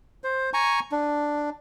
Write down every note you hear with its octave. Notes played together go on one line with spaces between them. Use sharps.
C5
G#5 A#5 C#6
D4